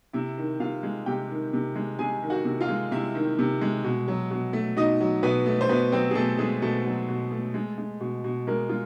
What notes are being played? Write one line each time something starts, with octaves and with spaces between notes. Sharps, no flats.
C3 E4 E5
D#3
C3 F4 F5
G#3
C3 G4 G5
D#3
C3
G#3
C3 G#4 G#5
D#3
F#4 F#5
C3
F4 F5
G#3
C3 E4 E5
D#3
C3
G#3
B2
F#3
B2
A3
B2 D#4 D#5
F#3
B2 B3 B4
A3
C5
B2 B3 B4
F#3 C4 C5
G#4
B2 A3 A4
G#3 A3 G#4
B2 A3 A4
F#3
B2
A3
G#3
G#3
B2
B2
G#3 A#3 A#4
G#3 F4